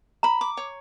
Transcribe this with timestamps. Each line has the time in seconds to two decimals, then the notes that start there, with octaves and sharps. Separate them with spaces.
0.23 A#5 B5
0.41 D6
0.57 C#5